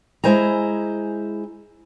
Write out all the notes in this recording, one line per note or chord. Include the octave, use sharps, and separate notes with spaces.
G#3 E4 C5 G#5 A#5